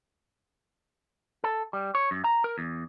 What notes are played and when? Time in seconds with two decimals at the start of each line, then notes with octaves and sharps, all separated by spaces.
1.44 A4
1.73 G3
1.95 C#5
2.11 F#2
2.24 A#5
2.44 A#4
2.58 E2